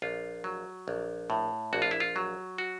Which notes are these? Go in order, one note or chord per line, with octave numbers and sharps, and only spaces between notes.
A#1 F4
F#3
A#1
A2
A#1 F#4
F4
E4
F4
F#3
F#4